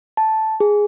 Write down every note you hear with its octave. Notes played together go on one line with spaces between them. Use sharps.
A5
G#4